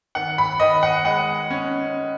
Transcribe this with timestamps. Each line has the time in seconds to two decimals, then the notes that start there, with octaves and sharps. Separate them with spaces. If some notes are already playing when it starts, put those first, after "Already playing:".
0.15 D#3 F#5
0.38 B5
0.60 D#3 D#5
0.83 F#5
1.05 G#3 F#5
1.51 C#4